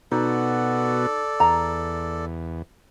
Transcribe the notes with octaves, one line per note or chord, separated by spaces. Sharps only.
B2 B3 D#4 F#4 A4 D5
E2 A#5